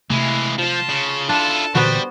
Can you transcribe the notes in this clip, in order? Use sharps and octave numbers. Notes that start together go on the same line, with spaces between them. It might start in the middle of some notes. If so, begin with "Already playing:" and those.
C3 E3 G#3 A3 E4 F5
F3 F4 A5
C#3
D4 E4 F4 A4 A5
A#2 D3 E3 G3 B3 F#4 C5